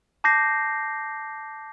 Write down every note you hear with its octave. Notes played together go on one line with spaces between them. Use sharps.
A5 D6 G6 A#6 C7